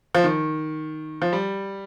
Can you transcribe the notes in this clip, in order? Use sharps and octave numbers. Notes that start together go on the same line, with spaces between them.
F3
D#3
F3
G3